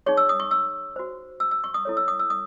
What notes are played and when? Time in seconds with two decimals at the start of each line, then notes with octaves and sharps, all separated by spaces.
0.06 D#4 G#4 C#5 C#6
0.17 E6
0.29 D#6
0.40 C#6
0.51 E6
0.96 F#4 C5
1.40 E6
1.51 E6
1.64 C#6
1.74 D#6
1.85 E4 A4 C#5
1.97 E6
2.08 D#6
2.19 E6
2.30 D#6